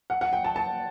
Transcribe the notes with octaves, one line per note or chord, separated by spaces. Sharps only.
F#5
F#5
G5
A5
A5